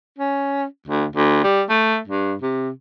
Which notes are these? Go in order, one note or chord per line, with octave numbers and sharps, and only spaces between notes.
C#4
D2
D2
G3
A3
G2
C3